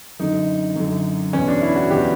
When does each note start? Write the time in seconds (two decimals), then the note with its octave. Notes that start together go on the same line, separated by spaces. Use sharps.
0.20 F#2 D3 D#4
0.76 F#2 D3
1.33 E2 B2 C#4
1.48 D4
1.62 E4
1.76 F#4
1.90 E2 B2 G4